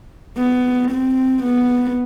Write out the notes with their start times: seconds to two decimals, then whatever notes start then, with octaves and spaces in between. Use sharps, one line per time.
0.37 B3
0.91 C4
1.43 B3